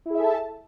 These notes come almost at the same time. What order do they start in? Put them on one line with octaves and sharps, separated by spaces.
E4 G#4 E5 A4 A5